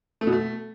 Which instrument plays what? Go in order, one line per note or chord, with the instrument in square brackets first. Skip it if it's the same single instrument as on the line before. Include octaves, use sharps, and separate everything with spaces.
[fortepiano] A3
B2
A3